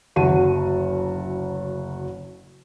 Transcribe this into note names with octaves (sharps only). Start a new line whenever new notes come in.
F#1 D2 F#4 A5 D#7